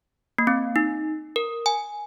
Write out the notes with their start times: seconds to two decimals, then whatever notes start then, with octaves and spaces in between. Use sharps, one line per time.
0.38 A#3
0.47 C4
0.76 D#4
1.36 A#4
1.66 G#5